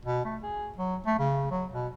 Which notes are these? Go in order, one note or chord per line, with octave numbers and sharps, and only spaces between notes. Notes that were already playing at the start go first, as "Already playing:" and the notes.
B2
A3
G#4
F#3
A3
C#3
F#3
B2